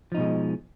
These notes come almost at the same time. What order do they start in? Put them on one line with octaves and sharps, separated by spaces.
F3 D#4 B2 G#3